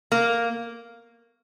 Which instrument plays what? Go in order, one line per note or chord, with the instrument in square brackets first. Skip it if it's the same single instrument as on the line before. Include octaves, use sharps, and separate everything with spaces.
[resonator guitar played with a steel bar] A#3